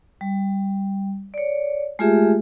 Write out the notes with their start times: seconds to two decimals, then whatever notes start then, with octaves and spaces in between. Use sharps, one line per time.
0.21 G3
1.34 C#5 D5
1.99 G#3 A3 F4 G4 G#4 E5